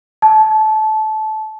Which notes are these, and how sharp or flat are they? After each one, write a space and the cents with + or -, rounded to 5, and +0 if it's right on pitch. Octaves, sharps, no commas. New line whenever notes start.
A5 -20